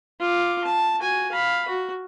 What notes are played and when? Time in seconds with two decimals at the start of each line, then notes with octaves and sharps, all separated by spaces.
0.20 F4 D6
0.64 A5
0.99 F#4 G#5
1.32 F5 B5
1.68 F#4